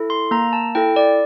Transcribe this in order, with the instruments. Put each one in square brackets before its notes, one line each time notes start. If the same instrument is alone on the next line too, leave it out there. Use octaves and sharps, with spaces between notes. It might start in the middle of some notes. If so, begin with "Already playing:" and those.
Already playing: [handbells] E4 A4
C6
A#3 A#5
A5
E4 A4 G5
D5